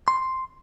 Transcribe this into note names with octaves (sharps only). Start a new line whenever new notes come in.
C6